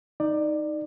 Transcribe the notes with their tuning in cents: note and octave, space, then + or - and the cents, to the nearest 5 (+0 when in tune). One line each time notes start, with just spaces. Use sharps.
D#4 +0 D5 +20